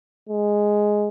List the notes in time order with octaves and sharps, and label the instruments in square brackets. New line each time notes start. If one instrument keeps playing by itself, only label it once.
[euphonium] G#3